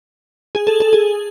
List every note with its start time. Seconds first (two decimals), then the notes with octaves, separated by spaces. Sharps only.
0.55 G#4
0.67 A4
0.80 A4
0.93 G#4